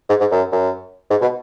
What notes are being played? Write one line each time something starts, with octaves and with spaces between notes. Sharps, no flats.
G#2
G#2
F#2
F#2
G#2
B2